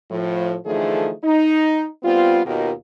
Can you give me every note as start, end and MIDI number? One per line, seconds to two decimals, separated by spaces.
0.11 0.56 45
0.11 0.56 53
0.65 1.12 50
0.65 1.12 52
0.65 1.12 53
0.65 1.12 57
0.65 1.12 63
0.65 1.12 68
1.24 1.87 63
2.03 2.41 55
2.03 2.41 59
2.03 2.41 60
2.03 2.41 65
2.46 2.72 39
2.46 2.72 47
2.46 2.72 63
2.46 2.72 65
2.46 2.72 67
2.46 2.72 70